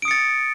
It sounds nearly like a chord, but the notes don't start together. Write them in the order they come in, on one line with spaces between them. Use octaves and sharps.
D7 D#6 C#7 A6